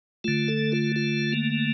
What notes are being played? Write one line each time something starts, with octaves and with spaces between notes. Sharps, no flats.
D3 A3 F4
A4
F4
F4
A#3